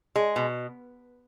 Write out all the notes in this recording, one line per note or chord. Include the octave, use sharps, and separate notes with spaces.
G#3
B2